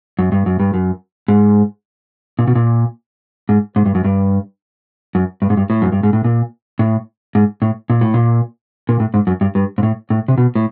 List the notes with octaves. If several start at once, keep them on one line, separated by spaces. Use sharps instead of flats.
F#2
G2
F#2
G2
F#2
G#2
A#2
B2
A#2
G#2
G#2
G2
F#2
G2
F#2
G2
G#2
G2
A2
F#2
G2
G#2
A2
A#2
A2
G#2
A2
A#2
A2
A#2
A#2
A2
G#2
F#2
G2
G2
G#2
A2
A2
C3
B2
A2